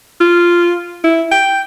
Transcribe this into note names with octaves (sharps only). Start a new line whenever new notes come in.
F4
E4
G5